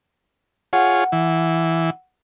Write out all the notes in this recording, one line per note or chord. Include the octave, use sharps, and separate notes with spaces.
F4 G#4 C#5 F#5
E3